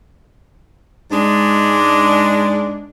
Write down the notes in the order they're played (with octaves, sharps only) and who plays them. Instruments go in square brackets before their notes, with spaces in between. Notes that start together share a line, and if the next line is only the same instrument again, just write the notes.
[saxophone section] G#2 G#3 D4